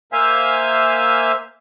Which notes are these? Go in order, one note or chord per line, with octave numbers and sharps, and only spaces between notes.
A#3 C5 E5 F5 G#5